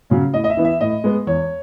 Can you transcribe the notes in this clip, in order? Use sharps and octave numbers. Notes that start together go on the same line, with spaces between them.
C#3 F#3 C#4
A2 D#5
D#5
E5
E3 B3
E5
A2 D#5
G#3 B3
E2 C#5